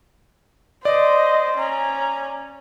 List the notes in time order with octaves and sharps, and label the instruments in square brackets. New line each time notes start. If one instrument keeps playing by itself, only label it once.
[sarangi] C5 [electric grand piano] D5 [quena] D#5
[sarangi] C#4 [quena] A#5